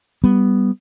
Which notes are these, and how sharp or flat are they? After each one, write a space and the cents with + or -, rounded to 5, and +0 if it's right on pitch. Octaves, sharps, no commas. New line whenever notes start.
G3 +0 B3 +0